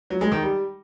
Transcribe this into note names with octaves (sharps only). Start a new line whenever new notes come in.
F#3
G#3
D#3
G3